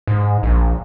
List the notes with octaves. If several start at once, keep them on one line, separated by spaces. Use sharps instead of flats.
G#2
A#1